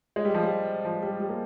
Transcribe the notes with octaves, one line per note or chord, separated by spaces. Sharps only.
G#3
G3
F3
G3
F3
G3
G3
A#3